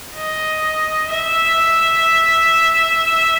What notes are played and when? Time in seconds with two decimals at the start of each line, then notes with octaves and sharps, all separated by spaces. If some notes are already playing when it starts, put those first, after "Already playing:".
0.15 D#5
1.10 E5